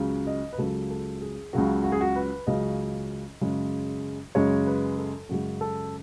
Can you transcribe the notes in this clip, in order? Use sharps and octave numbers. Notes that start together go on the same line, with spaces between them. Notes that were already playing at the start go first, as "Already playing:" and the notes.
Already playing: C#2 C#3 F#3
D#5
B4
C#2 C#3 F#3 A4
A4
G#4
C#2 C#3 F#3 F#4
F#4
G#4
F#4
B4
C#2 C#3 F#3 D#5
F#2 C#3 G#3
F#2 C#3 G#3 C#5
B4
A4
F#2 C#3 G#3 F#4
A4